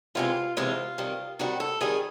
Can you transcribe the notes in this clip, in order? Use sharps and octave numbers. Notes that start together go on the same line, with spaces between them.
E2 C3 E3 G#3 F4
E2 C3 E3 G#3 F4
C3 D#3 G3
C3 D#3 G3 F#4
A4
C3 D#3 G3 G#4